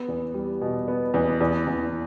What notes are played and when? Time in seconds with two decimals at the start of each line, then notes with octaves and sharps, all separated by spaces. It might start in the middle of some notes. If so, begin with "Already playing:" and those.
Already playing: B3
0.08 E2
0.34 G3
0.61 B2
0.88 B3
1.14 E2
1.41 E2
1.67 E2